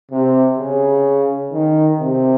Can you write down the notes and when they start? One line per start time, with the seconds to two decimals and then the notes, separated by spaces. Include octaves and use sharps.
0.12 C3
0.59 C#3
1.53 D#3
2.00 C3